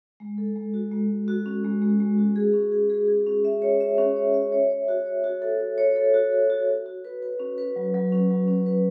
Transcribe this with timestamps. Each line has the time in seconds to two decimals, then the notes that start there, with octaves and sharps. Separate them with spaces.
0.20 G#3
0.38 A4
0.56 G#3
0.74 F#4
0.91 G#3
1.09 G#3
1.28 F#4
1.46 C#4
1.64 G#3
1.82 G#3
2.00 G#3
2.18 F#4
2.36 G#4
2.53 C#4
2.72 G#4
2.90 G#4
3.08 G#4
3.27 C#4
3.45 E5
3.62 C#5
3.80 E5
3.98 C#4
4.16 C#5
4.34 E5
4.52 C#5
4.70 C#5
4.88 F#4
5.06 C#5
5.24 F#4
5.42 A4
5.60 F#4
5.78 C#5
5.96 A4
6.14 F#4
6.32 A4
6.50 F#4
6.69 F#4
6.86 F#4
7.05 B4
7.22 B4
7.39 C#4
7.58 B4
7.76 F#3
7.94 F#3
8.12 C#4
8.30 F#3
8.48 C#4
8.66 B4